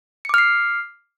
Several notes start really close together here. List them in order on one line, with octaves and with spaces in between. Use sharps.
C#7 D6 F6 C7